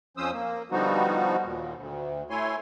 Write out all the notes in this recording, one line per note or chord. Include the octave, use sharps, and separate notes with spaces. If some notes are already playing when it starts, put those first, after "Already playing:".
F2 F3 C#4 C5 D#6 E6
A#3
D3 F3 G3 B3 D#4 F#4
D#2 A#2
D2
A3 E4 C#5 G#5 C6